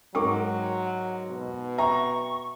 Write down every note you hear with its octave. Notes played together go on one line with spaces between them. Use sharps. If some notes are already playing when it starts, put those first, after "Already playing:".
G#2 F#3 A#4 G5 C#6 D6
B2
E5 G5 A#5 C#6